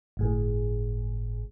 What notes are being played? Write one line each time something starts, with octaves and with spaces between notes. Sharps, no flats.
G1 A2 G#4